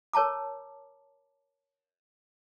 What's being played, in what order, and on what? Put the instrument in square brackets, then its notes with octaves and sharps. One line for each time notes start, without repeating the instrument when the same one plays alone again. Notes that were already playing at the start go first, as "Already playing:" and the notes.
[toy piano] A#4 C#5 A5 A#5 D6